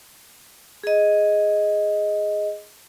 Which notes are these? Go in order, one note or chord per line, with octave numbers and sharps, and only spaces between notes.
G#4 D#5